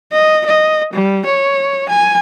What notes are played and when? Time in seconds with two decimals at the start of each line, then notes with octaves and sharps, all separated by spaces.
0.12 D#5
0.46 D#5
0.93 G3
1.26 C#5
1.89 G#5